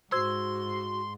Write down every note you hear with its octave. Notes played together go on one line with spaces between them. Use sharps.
G#2 F#4 C5 C6 E6 G#6